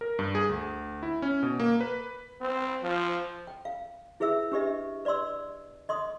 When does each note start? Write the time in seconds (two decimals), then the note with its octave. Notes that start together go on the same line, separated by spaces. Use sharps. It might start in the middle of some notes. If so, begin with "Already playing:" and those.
0.01 A#4
0.19 G2
0.35 G#4
0.49 D2
1.03 E4
1.22 C#4
1.43 B2
1.60 A#3
1.81 B4
2.41 C4
2.83 F3
3.47 G5
3.65 F5
4.20 E4 G#4 B4 E5 E6
4.52 D4 G4 B4 D#5 E5
5.05 B4 D5 D#5 C6 E6
5.89 D#5 C6 D#6